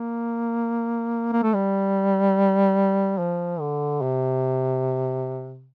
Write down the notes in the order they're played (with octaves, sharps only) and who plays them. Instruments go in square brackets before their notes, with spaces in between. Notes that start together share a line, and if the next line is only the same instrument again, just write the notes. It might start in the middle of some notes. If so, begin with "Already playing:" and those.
Already playing: [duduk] A#3
A#3
A3
G3
F3
D3
C3